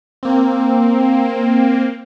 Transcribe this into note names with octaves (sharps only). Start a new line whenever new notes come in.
A#3 C4